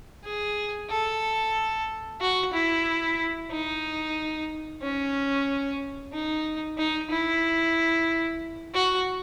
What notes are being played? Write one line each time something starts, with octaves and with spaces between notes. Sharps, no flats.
G#4
A4
F#4
E4
D#4
C#4
D#4
D#4
E4
F#4